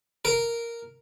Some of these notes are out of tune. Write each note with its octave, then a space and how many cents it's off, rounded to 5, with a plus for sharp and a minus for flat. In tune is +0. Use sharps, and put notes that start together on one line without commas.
A#4 -5